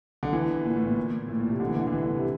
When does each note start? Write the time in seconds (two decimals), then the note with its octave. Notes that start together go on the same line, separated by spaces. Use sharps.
0.23 D3
0.33 E3
0.65 A#2
0.76 A2
0.86 A#2
0.97 A#2
1.28 A2
1.39 A#2
1.50 C3
1.60 D3
1.68 E3
1.77 D3
1.87 D3
1.92 E3
2.03 D3
2.13 C3